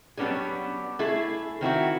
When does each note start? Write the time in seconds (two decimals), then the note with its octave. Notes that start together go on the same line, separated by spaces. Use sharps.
0.17 F#3 G3 B3 C#4 D4 G#4
0.99 A3 E4 G#4
1.61 D#3 C4 E4 F#4